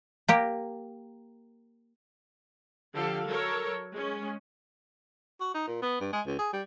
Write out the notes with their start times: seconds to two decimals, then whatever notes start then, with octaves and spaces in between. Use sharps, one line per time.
0.28 A#3 G4 A#4
2.94 D3 F3 G4 A4 F5
3.26 F#3 A4 A#4 C#5
3.93 G#3 C#4
5.40 F#4
5.54 D#4
5.67 A#2
5.82 B3
6.00 G2
6.13 G#3
6.26 C#2
6.39 G#4
6.53 G3